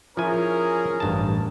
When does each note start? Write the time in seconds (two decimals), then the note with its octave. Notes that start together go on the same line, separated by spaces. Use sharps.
0.17 F3 C#4 E4 G#4 A#4 G#5
1.00 A1 G2 A5